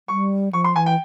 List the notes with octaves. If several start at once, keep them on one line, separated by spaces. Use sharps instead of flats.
G3 C#6
F3 C#6
C6
E3 G#5
G5